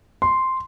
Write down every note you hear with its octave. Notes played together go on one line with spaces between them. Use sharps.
C6